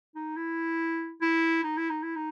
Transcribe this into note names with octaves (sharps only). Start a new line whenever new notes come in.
D#4
E4
E4
D#4
E4
D#4
E4
D#4